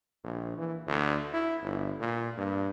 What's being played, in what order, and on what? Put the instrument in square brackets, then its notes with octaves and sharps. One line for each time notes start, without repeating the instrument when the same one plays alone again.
[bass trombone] A#1
E3
D2
E4
G1
A#2
G2